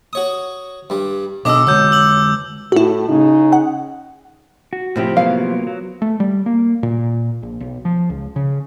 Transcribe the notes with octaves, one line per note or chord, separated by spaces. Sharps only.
F#4 C#5 D#6
G2 G3
B1 B2 D4 D#5 D6 E6
D3 F#3 G#3 E6 G6
E6 F#7
A2 E4 F#4
C#3 D#4
F#5
F#4
A2 C3 F3 E4 G4
F#3 A#3 B3 F5
F#3
A3
G3
A#3
A#2
A#1
B1
F3
C#2
C#3